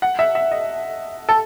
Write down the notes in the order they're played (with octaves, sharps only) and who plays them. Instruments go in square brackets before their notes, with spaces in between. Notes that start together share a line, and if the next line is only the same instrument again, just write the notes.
[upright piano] F#5
E5
E5
D#5
A4